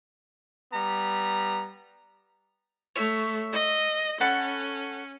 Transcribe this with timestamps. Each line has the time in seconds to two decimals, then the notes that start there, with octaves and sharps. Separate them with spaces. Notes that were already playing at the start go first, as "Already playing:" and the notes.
0.74 G3 B3 A#5
2.96 A3 C#5 E5
3.52 D#5
4.21 C#4 A4 F#5 B5